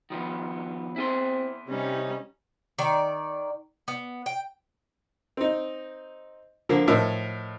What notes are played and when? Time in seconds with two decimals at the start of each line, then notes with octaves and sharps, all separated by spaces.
0.10 D#3 F3 B3
0.96 C4 E4 G#4 C6
1.68 C3 G3 C#4 D#4
2.79 D#3 D5
3.88 B3
4.26 G5
5.37 C4 D#4
6.69 D3 F3 A#3
6.88 A2 F3 D#4 A#4 E6